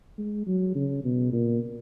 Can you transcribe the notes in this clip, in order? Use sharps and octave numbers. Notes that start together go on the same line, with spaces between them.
G#3
F#3
C#3
B2
A#2